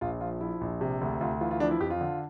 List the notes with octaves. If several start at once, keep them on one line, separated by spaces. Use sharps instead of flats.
A#1 F4
F3 F4
F3 E4
A#1
C3
D2
D2 F4
E3 F4
F4
F3 D4
E4
F2 G4
F4
D3